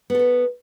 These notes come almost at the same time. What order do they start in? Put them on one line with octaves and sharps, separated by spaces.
B3 A4 B4